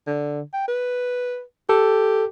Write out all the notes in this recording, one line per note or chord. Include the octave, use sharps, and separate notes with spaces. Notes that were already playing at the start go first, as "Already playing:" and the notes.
D3
G5
B4
G4 A4